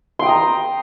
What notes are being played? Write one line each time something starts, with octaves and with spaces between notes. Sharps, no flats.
G5 A#5 C6 D#6